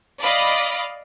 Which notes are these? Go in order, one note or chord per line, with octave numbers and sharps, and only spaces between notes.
D5 D#5 F5 B5 D6